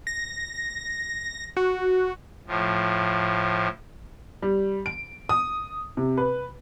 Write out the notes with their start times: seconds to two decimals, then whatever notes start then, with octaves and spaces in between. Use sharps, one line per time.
0.07 A#6
1.57 F#4
2.48 A2 F3
4.42 G3
4.86 D7
5.29 D#6
5.97 C3
6.18 B4